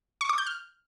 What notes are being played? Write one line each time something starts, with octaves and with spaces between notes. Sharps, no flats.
C#6
D6
G6
F6